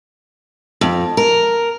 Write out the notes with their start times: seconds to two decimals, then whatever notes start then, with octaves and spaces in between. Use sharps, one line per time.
0.81 F2
1.17 A#4